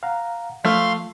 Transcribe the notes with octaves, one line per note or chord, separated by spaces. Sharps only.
F5 F#5 A#5
F3 A3 F5 C6 F6